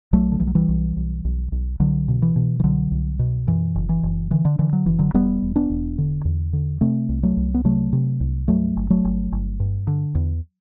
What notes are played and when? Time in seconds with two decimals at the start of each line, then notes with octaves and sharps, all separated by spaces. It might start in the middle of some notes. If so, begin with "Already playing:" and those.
0.13 B1 F#3 A3
0.32 D3
0.40 B1 E3
0.47 F#3
0.55 E3 G3
0.68 B1
0.97 B1
1.25 B1
1.52 B1
1.80 C2 D3 F#3
2.08 B2
2.22 E3
2.36 B2
2.60 E3
2.64 C2 D3 F#3
2.91 C2
3.19 B2
3.47 F#2 E3
3.75 F#1
3.89 E3
4.03 F#1
4.31 D3 E3
4.45 D3
4.59 D3 E3
4.73 F#3
4.86 F#1 E3
4.99 D3 F#3
5.14 E1 G3 B3
5.42 E1
5.56 B3 D4
5.70 E1
5.98 D3
6.25 E2
6.53 D3
6.81 C3 A3 C4
7.09 C2
7.23 F#3 A3
7.37 C2
7.54 B3
7.64 C3 F#3 A3
7.93 C3
8.20 C2
8.48 G2 F#3 A3
8.76 G1
8.90 F#3 A3
9.04 G1
9.32 G1
9.60 G2
9.87 D3
10.15 E2